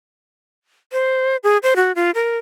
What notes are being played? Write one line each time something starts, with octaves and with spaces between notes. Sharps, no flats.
C5
G#4
C5
F#4
F4
A#4